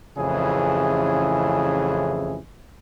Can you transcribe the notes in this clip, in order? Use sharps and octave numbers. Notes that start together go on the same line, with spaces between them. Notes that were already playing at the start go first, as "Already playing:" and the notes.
A1 F2 C#3 E3 E4 G#4